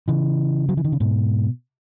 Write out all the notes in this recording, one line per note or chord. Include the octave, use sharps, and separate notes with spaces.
C#3 E3
F#3
E3
D#3
C#3
G#2 B2